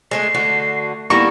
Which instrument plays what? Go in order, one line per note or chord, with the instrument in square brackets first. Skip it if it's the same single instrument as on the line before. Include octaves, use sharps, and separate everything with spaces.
[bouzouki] G#3 A3 D4 [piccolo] C7
[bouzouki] D3 F#4 [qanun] A3
[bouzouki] G3 A#3 A4 [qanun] B3 D#4 E4 [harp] C#6 [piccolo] A#6